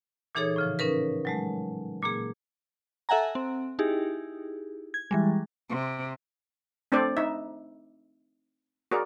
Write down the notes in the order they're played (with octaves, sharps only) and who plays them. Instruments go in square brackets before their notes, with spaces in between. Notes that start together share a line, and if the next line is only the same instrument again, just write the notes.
[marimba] A#2 E3 D#4 G#4 A4 C#5
A2 C#3 F3
C#4 D#4 A#4 B4
F#3 G#3 A3
A#2 A#3 G#4
[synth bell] A4 E5 F#5 G#5 A#5
C4
D#4 E4 G4 G#4
G#6
E3 G3 G#3
[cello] C3
[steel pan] A3 C4 D4 A4 C5 D5
D#4 E5
F#4 G#4 A#4 D5